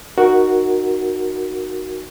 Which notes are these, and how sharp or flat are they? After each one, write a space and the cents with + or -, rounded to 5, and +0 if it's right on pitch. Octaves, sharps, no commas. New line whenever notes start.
D#4 -15 F#4 +0 A#4 +0